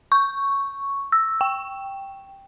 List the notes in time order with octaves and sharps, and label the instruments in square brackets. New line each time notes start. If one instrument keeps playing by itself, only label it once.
[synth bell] C#6
E6
G5